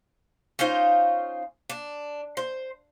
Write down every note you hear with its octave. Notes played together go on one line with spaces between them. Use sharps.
C#4 D#4 F4 C5
D4
C5